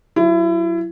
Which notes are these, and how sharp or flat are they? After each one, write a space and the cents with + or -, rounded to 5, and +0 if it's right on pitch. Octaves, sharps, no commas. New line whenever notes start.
F#3 +0 E4 +30